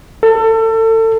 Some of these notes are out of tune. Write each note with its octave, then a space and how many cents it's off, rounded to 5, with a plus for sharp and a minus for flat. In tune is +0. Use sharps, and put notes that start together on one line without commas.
A4 +30